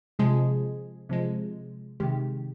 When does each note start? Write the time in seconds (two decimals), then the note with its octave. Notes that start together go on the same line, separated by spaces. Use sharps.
0.19 C3 F3 G#3 G#4
1.09 C3 F3 G#3
2.00 C3 D#3 G#3 G4